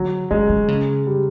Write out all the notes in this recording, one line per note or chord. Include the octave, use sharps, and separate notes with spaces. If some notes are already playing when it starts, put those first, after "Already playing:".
Already playing: D3 F#3
D3 G#3
D3
C#3
G3